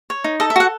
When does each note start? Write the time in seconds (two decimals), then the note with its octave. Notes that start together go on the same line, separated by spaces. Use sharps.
0.10 C#5
0.24 D#4
0.40 A4 D#5
0.50 E5
0.56 F#4 F#5